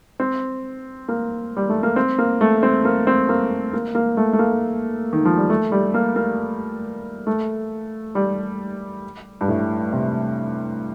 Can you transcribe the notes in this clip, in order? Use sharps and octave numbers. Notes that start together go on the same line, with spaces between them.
C4
A#3
G3
A3
A#3
C4
A#3
A3
C4
A#3
C4
A#3
A#3
A#3
A3
A3
A#3
D#3
F3
G3
A3
G3
A#3
A#3
A3
G3
G2
A2
C3